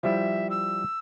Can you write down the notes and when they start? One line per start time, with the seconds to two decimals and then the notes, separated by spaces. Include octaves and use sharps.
0.03 F3 G3 E4 E5
0.50 E6